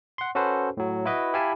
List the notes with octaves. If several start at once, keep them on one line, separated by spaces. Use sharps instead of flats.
F#5 C6
C#4 F#4 A4 B4 C5
A2 F#3
E4 F#4 B4 D#5
E4 G4 F5 G#5 A5 B5